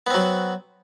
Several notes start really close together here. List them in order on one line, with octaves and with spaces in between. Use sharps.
B3 C4 F#3